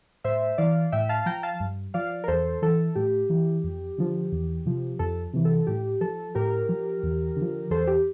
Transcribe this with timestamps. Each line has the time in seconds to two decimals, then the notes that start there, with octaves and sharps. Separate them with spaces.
0.24 A2 C5 E5
0.58 E3 D5 F5
0.92 A2 E5 G5
1.09 F5 A5
1.26 F3 G5 A#5
1.43 F5 A5
1.60 G2
1.94 F3 D5 F5
2.24 A#4
2.28 E2 A4 C5
2.62 E3 A4
2.95 A2 G4
3.30 E3
3.64 F2
3.98 D3 F3
4.32 E2
4.66 C3 F3
4.99 F2 A4
5.33 C3 E3
5.45 A4
5.67 A2 G4
6.01 F3 A4
6.35 A2 G4 A#4
6.69 F3
7.03 E2
7.37 D3
7.42 F3
7.71 E2 A4 C5
7.87 G4